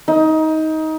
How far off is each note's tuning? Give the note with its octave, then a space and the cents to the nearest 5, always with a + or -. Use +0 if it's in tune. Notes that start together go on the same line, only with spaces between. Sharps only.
D#4 +20